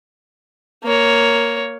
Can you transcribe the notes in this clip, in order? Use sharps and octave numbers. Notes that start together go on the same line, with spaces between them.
A#3 C#5